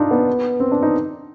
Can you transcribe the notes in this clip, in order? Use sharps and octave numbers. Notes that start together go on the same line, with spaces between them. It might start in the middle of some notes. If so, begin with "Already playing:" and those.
Already playing: D4 D#4 F4
B3
C4
D4
D#4